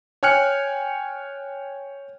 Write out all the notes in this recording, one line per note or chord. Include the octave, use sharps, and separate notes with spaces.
C#5 G5 G#5 F6 F#6 C#7